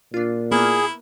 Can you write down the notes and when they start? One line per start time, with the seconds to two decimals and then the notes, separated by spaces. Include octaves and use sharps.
0.14 A#2 D4 F4
0.52 A#3 B3 E4 G#4 F6